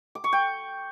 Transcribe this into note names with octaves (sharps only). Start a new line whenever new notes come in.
D6
C#6
G5